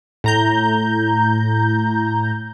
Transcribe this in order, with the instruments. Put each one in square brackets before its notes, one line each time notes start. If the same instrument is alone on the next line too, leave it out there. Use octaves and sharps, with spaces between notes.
[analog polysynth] A2 A#5 G6